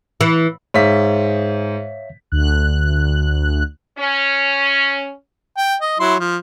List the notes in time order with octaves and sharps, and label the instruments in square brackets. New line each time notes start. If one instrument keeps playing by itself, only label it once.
[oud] E3
[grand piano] G#2 B6 [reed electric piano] C#5 E5 F5
[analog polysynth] D2 F#6
[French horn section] C#4
[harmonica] G5
D#5
F#3 E4 C6
F3